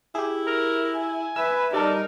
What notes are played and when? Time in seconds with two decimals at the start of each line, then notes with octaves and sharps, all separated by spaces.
0.15 E4 G4 G#4
0.47 A#4
0.95 G#5
1.36 B4 E5 E6
1.73 G3 D#4 A4 A#4 D5